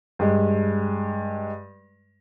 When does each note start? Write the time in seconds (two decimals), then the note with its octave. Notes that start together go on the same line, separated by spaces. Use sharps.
0.19 G2 G#3